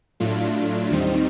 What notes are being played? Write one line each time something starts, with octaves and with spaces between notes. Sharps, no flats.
A2 F#3 A3 D4 F4
D#2 D#3 G3 C4 D#4